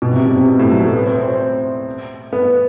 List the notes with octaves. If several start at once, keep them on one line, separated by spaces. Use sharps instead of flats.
B2
C3
B2
C3
B2
A2
F#3
A3
B3
C4
C4
C4
B3